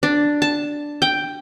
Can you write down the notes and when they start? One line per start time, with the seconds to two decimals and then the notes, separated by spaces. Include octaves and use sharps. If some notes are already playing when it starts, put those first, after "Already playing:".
0.03 D4
0.42 A5
1.02 G5